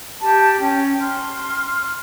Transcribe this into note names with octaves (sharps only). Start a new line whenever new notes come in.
G4 A5
C#4 G5
C6 F6